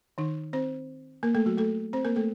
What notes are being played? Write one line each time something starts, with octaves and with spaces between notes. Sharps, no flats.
D#3 D#4
C4 C5
A#3 A#4
A3 A4
F#3 F#4
A3 A4
C4 C5
A#3 A#4
A3 A4